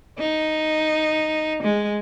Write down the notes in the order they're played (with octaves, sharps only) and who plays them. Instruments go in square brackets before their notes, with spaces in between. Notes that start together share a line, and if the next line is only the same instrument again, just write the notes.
[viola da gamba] D#4
G#3